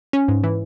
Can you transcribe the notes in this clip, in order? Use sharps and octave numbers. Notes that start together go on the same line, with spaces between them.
C#4
G#2
E3